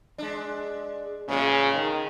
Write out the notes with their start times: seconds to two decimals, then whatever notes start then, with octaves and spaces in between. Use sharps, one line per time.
0.18 G#3 D4
1.28 A2 C#3 G#3
1.75 D#3